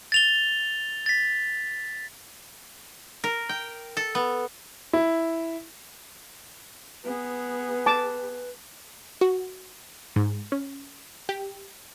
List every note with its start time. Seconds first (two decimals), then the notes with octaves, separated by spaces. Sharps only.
0.12 A6 F7 G7
1.06 A6 B6
3.24 A#4
3.49 G5
3.97 A4
4.15 B3
4.93 E4
7.04 B3 G#4 B4
7.86 A5 D6
9.21 F#4
10.16 G#2
10.52 C#4
11.29 G4